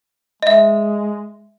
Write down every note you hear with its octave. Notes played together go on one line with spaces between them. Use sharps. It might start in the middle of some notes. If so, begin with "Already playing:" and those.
G#3 D#5 E5